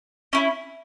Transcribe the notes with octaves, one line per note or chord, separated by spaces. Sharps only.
C#4 E4